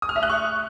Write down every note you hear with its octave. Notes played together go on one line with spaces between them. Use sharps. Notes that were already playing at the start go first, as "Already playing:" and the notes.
D#6
F6
E5
F#6
C#6